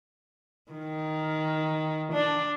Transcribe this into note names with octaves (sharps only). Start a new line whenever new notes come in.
D#3
D4